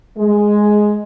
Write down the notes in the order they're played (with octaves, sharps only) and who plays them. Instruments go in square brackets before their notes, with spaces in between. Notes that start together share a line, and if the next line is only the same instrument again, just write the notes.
[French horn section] G#3